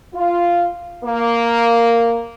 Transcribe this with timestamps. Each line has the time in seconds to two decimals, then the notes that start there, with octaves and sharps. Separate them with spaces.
0.13 F4
1.04 A#3